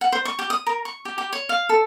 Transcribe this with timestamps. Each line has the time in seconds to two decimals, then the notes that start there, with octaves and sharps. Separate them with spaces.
0.01 F#5
0.12 C5
0.25 C#6
0.39 G4
0.50 D#6
0.67 A#4
0.85 C#6
1.05 G4
1.18 G4
1.33 C#5
1.49 F5
1.69 A4